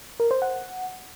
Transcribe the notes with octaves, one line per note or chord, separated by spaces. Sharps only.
A#4
C5
F#5